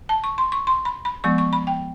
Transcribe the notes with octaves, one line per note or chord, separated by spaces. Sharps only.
A5
C#6
C6
C#6
C6
B5
B5
F3 G#3 B3 C#6
C#6
B5
G5